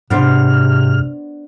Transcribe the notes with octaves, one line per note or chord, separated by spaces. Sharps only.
G#2 C3 B3 D4 C5 F6